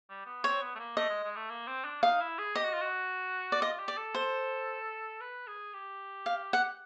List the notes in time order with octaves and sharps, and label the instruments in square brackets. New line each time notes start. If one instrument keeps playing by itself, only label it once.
[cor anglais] G3
B3
[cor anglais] C4 [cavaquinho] C#5
[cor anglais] B3
A3
A#3
[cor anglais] A3 [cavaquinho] D#5
[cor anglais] G#3
G#3
A3
A#3
C4
D4
[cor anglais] D#4 [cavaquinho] F5
[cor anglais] E4
G#4
[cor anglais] G4 [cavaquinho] D#5
[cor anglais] F#4
F4
F#4
[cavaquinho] D5
[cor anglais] F4 [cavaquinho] D#5
[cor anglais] G4
[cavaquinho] D5
[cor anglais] A4
[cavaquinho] C5
[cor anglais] B4
G#4
G4
[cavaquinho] F5
F#5